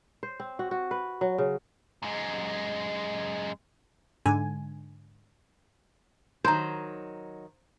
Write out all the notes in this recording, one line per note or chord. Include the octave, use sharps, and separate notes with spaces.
C5
C4
F#4
F#4
B4
F#3
C#3
F#2 G#3
G#2 D3 G#5
D#3 F#3 D#4 C5 A#5